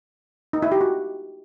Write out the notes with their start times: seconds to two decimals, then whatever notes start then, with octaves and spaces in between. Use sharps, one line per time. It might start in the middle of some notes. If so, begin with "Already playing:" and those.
0.53 D#4
0.62 E4
0.72 G4
0.81 F#4